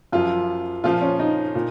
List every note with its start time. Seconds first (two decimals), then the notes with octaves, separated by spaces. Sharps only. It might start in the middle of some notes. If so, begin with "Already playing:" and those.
0.12 F#2 F3 F4
0.84 A#2 F3 F4
1.01 C#4
1.19 D#4
1.55 A#2